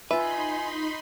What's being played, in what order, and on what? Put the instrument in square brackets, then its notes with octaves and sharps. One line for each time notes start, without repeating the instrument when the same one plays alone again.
[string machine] D#4 B5 C6 [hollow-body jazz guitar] F4 B4 [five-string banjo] E5 [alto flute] G#5